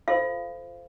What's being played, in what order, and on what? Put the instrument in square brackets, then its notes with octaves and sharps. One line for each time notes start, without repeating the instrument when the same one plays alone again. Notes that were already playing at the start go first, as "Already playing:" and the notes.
[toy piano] F4 A4 C5 F5